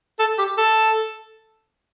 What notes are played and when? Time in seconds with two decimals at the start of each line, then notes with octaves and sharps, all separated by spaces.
0.19 A4
0.39 G4
0.58 A4